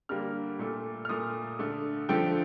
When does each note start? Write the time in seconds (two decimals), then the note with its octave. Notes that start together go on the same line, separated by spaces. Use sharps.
0.09 D3 G3 A#3 F6
0.59 A#2 A3
1.05 F6
1.09 A#2 A3 D#6
1.59 D3 A3
2.09 D3 F3 A3 G5